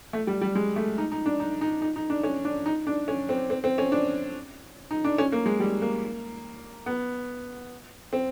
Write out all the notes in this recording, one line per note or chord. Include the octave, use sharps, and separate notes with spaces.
A3
G3
G3
G#3
A3
D#4
D#4
D4
D#4
D#4
D#4
D#4
D4
C#4
D4
D#4
D4
C#4
C4
C4
C4
C#4
D4
D#4
D4
C#4
A#3
G#3
G3
A#3
B3
C4